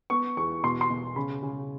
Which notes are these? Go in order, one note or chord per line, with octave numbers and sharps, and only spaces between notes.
B3 C#6
E2 C#6
B2 C6
C6
B2
C#3 B5
C#3